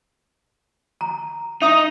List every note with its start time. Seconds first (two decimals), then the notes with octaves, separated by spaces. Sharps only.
1.01 A#5
1.62 D#4 E5 D#6